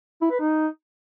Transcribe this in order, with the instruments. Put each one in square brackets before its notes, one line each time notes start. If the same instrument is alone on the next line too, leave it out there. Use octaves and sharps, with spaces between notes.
[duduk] E4
B4
D#4